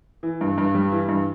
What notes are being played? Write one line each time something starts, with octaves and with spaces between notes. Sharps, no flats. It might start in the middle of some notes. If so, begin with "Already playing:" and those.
E3
G2
G2
G3
E3
G2